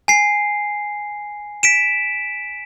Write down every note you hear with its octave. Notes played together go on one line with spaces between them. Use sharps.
G#5 C7
B6 D7 E7